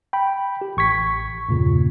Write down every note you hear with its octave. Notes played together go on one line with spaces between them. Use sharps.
G5 B5
G4
A1 C#6 G#6 B6
E2 G2 A#2 C#3